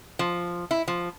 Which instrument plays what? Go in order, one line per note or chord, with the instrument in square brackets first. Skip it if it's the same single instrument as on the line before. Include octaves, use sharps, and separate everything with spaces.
[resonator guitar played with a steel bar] F3
E4
F3